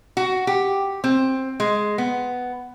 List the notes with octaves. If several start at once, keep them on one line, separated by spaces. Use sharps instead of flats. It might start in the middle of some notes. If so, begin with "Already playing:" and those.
F#4
G4
C4
G#3
B3